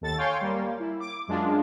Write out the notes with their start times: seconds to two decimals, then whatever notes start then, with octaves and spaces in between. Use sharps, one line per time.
0.01 D#2 A4 A6
0.17 C#5 F5 G5 G#5 C6
0.41 G3 A#3
0.79 E4
1.00 D6
1.28 F#2 G#3 D4 F4